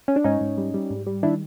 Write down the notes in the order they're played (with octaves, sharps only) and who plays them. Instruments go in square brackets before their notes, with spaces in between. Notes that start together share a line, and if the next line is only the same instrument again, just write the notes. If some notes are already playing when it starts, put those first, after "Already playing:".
[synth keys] C#4
D4
G#2 C#4 D#4
G#2
G3
G3
G#2
G3
D#3 D4 E4